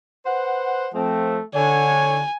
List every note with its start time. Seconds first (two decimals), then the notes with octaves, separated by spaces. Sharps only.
0.25 B4 C5 F#5
0.95 F3 A3 C4
1.55 D3 C#5 G#5